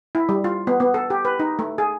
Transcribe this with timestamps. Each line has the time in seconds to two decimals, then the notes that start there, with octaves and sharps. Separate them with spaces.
0.15 E4
0.29 G3
0.44 F4
0.67 B3
0.80 B3
0.94 A4
1.10 G4
1.25 B4
1.40 D#4
1.59 A3
1.78 G#4